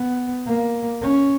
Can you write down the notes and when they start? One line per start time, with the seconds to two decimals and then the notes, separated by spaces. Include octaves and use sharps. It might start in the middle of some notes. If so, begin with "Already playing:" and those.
Already playing: B3
0.47 A#3
1.02 C#4